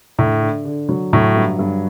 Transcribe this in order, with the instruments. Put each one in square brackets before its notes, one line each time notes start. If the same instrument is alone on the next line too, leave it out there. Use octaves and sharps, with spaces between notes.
[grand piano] A2 [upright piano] D3
[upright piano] D3
D3
F#3
[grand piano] A2 [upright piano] F#3
[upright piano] G2
G2